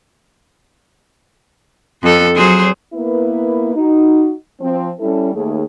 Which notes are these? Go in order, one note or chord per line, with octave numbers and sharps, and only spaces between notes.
F2 A4
F#3 G#4 C5
A#3 B3 E4 A#4 B4
D#4 F#4
F3 C4
G3 C#4 E4 A4
D#2 A3 G#4